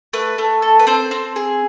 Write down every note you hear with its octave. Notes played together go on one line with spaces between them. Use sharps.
A3 B4
A3
A4
B4
C4 C5
C4
G#4